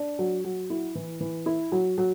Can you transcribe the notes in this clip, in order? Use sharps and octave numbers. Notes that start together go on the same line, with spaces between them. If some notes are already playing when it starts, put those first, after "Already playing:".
Already playing: D4
F#3
F#3
E4
E3
E3
E4
F#3
F#3